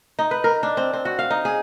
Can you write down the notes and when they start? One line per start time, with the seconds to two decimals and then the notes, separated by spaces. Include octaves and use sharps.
0.19 D#4
0.31 B4
0.44 A#4
0.63 D4
0.77 C4
0.93 C4
1.05 F#4
1.19 F5
1.31 D#4
1.45 G#4